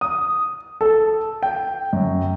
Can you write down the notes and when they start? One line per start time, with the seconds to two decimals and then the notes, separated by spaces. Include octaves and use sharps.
0.01 D#6
0.81 A4
1.43 G5
1.93 F#2